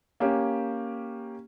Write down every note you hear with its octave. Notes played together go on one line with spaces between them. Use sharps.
A#3 C#4 G4